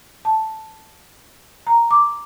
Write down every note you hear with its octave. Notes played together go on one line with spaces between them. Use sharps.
A5
A#5
D6